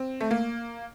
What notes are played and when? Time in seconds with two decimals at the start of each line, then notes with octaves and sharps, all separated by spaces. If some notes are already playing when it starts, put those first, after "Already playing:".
Already playing: C4
0.21 A3
0.31 A#3